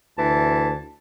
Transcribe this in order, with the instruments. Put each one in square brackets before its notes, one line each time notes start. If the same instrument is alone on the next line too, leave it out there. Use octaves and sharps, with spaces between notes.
[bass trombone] D2 [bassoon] E3 [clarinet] A5